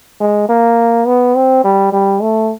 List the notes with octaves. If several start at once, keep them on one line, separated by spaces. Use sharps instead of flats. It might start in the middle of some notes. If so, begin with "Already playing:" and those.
G#3
A#3
B3
C4
G3
G3
A3